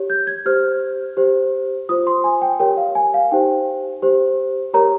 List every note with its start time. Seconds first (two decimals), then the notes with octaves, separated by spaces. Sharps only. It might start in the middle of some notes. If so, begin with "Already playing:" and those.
Already playing: G4 C#5
0.10 G6
0.27 G#6
0.46 G4 C5 F6
1.17 G4 C5
1.89 F4 C5 D#6
2.07 C6
2.24 G#5
2.42 G5
2.60 G4 A#4 C#5 G5
2.77 F5
2.95 G#5
3.14 F5
3.31 D#4 G4 C5 G5
4.02 G4 C5
4.74 G4 A#4 C#5 A#5